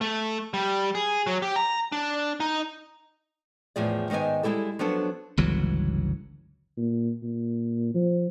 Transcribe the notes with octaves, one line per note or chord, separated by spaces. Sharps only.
A3
G3
G#4
F#3
G4
A#5
D4
D#4
E2 A2 F3 G#4 D5
G#2 D#3 B3 D#5 G#5
G3 G#3 E4 G4 A4
F3 F#3 B3 D4 A4
G1 C#2 E3 F#3
A#2
A#2
F3